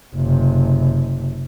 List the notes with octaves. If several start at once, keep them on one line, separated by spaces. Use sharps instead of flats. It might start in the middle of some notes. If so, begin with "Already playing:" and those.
F#1 C3